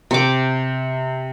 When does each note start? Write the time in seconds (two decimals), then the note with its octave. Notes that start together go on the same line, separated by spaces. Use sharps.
0.11 C3 D6